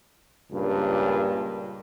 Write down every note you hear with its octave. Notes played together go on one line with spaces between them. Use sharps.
C#2 G2 A#2